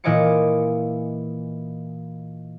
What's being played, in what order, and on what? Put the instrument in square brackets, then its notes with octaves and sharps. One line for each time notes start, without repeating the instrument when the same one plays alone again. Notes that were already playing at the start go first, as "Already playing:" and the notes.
[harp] A#2 E3 D#5 G#5 D6 C#7